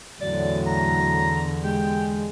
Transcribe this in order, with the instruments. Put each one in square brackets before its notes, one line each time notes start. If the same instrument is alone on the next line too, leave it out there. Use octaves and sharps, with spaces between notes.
[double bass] E2 D3 [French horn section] A2 F#3 [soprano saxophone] D5
[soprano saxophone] A#5
[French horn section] G#3 [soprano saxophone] G4